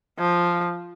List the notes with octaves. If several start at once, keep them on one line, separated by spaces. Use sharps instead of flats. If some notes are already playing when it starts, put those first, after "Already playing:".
F3